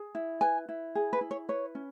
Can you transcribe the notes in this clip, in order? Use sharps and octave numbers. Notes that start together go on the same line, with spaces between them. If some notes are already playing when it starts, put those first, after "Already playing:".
Already playing: G#4
E4
B4 G#5
E4
G#4
B4
E4
C#5
B4 C#5
C#4